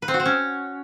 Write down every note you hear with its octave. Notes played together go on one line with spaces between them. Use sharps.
B4
C4
F#4
C4
C#4